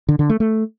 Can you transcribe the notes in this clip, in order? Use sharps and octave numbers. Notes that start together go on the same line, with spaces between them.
D3
D3
A3
A3